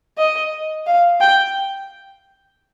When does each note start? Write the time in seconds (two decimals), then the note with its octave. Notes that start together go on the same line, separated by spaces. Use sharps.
0.18 D#5
0.87 F5
1.21 G5